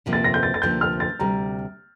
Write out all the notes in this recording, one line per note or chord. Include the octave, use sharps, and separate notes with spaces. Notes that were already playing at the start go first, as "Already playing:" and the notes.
D2 C3 F3 A#3
A6
A#6
G6
A6
A6
D2 C3 F3 A#3 G6
F6
A6
D2 C3 G3 A#5